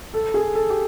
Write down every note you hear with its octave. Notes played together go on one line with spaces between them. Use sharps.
A4
G#4
A4
G4